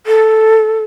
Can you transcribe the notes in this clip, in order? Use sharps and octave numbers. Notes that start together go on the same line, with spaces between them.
A4